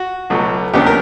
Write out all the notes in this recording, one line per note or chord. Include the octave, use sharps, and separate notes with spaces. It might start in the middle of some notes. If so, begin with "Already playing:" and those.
Already playing: F#4
C#2 B2 F#3 A3
D#2 C#3 F#3 B3 D4 G4
A#4